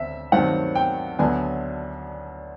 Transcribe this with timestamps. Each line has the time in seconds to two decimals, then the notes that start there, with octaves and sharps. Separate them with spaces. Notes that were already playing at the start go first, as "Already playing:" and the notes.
Already playing: D2 D3 C4 E5
0.32 G2 D#3 F#3 A3 C4 F#5
0.75 G5
1.19 D2 D3 F#3 B3 D4 G#5